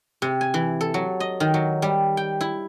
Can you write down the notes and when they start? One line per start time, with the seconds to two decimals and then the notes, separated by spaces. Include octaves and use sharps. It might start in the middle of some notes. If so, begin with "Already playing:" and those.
0.22 C3
0.41 G#5
0.54 E3
0.81 A4
0.94 F#3
1.20 D#5
1.40 D#3
1.54 F#3
1.82 G3
2.17 G5
2.41 E4